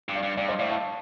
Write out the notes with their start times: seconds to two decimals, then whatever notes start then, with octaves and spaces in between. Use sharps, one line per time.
0.09 G2
0.15 D5 F5
0.23 G2
0.37 G2 D5 F5
0.48 C5 D#5
0.59 A2 D5 F5
0.70 F5 A5